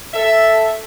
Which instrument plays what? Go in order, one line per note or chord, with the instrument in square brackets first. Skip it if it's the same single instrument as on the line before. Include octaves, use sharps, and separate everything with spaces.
[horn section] A4 E5